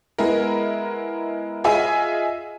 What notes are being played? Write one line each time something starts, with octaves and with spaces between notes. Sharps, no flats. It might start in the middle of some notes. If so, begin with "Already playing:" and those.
G#3 B3 E4 A#4
F4 G#4 D#5 E5 G#5